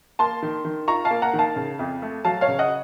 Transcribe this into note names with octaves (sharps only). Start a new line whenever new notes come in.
A#3 A5 C6
D#3
D#3
F4 A#5 C#6
F5 A5
A#3
F#5 A#5
D#3
F5 A5
C#3
F2
A3
F#3 F5 A5
C#5 F5
C#3
D#5 F#5